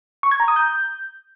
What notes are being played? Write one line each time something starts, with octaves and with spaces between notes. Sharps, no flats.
C#6
G#6
A#5
D#6
G6